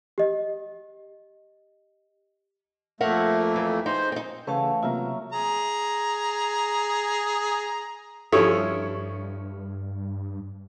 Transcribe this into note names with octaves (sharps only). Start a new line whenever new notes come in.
G4 D#5
F2 A3 A#3 A#4 E5 F#5
E3
D#4 G#4 C5
C4 D#4
C#3 E3 A3 B4 C#5 F5 F#5 A5
C3 F#3 A#3 F4 E5 A#5
G#4 A#5
G2 F3 C#4 E4 G4 A4 C#5